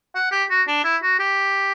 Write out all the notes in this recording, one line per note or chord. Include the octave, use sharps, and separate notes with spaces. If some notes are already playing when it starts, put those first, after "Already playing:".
F#5
G4
F#4
D4
E4
F#4
G4